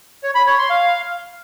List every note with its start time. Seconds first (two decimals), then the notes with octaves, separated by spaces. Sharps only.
0.23 C#5
0.35 B5
0.47 C#5
0.58 C6
0.70 F5